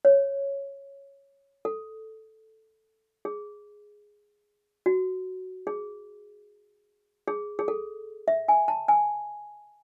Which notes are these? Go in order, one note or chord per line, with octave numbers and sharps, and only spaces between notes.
C#5
A4
G#4
F#4
G#4
G#4
G#4
A4
E5
G#5
A5
G#5